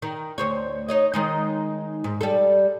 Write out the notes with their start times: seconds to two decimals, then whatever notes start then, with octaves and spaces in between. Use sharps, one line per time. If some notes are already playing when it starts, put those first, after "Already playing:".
0.02 D#3
0.38 D2 C5 C#5
0.88 D#4 C#5 D#5
1.14 D#3 G#3 D#4
2.04 G#2
2.21 G3 A4